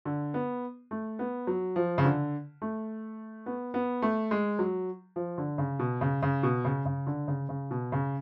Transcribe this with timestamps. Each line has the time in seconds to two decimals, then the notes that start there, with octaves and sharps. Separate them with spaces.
0.05 D3
0.34 B3
0.91 A3
1.19 B3
1.47 F#3
1.76 F3
1.98 C#3
2.05 D3
2.62 A3
3.46 B3
3.74 B3
4.02 A3
4.31 G#3
4.59 F#3
5.16 F3
5.38 D3
5.58 C#3
5.79 B2
6.01 C#3
6.22 C#3
6.43 B2
6.65 C#3
6.85 C#3
7.07 D3
7.28 C#3
7.49 C#3
7.71 B2
7.92 C#3